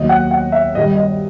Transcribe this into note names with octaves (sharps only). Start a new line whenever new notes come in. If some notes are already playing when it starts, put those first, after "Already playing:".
Already playing: D#2 D#3 F#3 D#5
F#5
F#5
E5
G2 D#3 G3 D#5
D#5